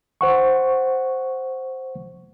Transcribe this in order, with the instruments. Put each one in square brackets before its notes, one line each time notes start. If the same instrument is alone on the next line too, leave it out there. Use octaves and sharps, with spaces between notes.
[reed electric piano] C5 F#5 C#6